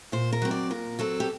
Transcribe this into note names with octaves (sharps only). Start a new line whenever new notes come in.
A#2 C5
A#4
F#3 C4
D5
A#2 A#4
F#3 C4 A4
G4